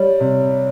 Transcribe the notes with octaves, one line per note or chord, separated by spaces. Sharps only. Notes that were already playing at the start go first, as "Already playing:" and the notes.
Already playing: G3 C#5
C3